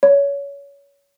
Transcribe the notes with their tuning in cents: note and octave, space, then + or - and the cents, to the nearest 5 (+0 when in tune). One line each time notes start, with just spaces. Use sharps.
C#5 +25